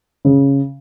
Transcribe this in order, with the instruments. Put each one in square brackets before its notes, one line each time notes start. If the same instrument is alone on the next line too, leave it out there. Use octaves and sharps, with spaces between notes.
[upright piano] C#3